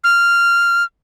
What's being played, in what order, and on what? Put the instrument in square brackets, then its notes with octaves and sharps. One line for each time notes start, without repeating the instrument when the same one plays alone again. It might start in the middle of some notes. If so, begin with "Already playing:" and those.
[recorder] F6